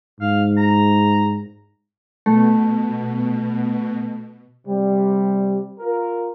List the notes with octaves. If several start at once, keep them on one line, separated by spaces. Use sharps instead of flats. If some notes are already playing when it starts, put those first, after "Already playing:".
G#2 F5
A#5
B2 A3
C3 G3
F4 A#4